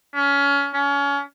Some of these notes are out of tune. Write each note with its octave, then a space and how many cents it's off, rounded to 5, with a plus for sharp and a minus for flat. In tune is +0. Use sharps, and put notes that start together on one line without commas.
C#4 +25
C#4 +30